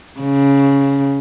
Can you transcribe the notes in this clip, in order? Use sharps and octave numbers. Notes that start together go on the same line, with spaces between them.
C#3